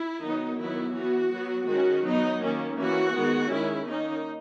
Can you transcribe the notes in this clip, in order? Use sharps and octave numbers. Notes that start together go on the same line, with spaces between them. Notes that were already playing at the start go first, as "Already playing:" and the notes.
Already playing: E4
D#3 F#3 B3 D#4
D#3 F#3 B3 E4
E3 B3 F#4
F#3 B3
D#3 G#3 C#4 F#4
F#3 B3 D#4
D#3 A#3 C#4
E3 A#3 C#4 F#4
D#3 G#3 B3
D#3 G#3 C#4 E4
D#3 A#3 C#4 D#4